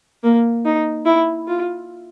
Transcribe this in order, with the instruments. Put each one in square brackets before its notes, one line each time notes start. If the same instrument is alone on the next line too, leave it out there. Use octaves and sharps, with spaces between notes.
[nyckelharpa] A#3
D#4
E4
F4